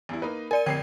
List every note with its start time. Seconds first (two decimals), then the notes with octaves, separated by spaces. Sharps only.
0.09 E2 G2 E4
0.22 A#3 D#4 B4
0.51 A#4 D5 G#5 D#7
0.66 A1 F2 D3 G5 G#6 C7